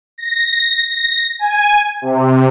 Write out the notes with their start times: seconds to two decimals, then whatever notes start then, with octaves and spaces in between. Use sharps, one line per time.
0.18 A#6
0.89 A#6
1.39 G#5
2.02 C3